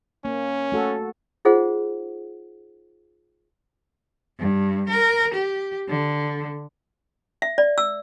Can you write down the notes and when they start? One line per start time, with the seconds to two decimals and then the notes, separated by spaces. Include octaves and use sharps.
0.25 A#3 C#4
0.72 A3 F#4 A4
1.45 D#4 F4 G#4 C5 F#5
4.40 G2
4.89 A#4
5.34 G4
5.89 D3
7.42 E5
7.58 D5
7.78 E6